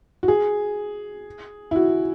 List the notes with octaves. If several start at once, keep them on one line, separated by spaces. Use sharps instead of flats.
F#4
G#4
E4
F#4